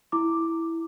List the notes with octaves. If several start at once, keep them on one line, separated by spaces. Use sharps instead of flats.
E4 D6